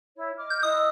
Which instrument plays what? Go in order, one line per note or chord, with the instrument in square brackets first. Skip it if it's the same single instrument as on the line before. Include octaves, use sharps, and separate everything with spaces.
[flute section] E4 C#5
D#5 D6 F6
[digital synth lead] G6
[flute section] E4 E6 F#6 [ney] D#5 [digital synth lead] D#6